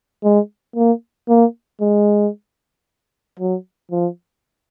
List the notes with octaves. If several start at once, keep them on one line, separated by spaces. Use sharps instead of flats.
G#3
A#3
A#3
G#3
F#3
F3